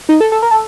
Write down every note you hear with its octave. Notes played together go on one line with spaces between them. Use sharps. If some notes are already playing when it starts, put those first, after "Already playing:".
D#4
A4
A4
A#4
A4